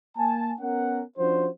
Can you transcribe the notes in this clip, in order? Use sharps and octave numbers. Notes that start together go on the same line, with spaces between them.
A#3 G#5 A5
B3 C#4 A#4 F#5
F3 C#4 D4 F#4 C5